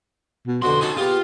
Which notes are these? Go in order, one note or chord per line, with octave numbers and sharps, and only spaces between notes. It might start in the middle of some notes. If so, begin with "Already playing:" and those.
B2
F2 B2 D3 F#4 C6
C#4 D#4 G#4 A4 C5
B3 F4 G4 G#4